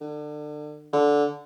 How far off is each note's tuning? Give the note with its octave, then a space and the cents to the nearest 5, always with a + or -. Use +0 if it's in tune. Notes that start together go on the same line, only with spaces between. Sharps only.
D3 +30
D3 -10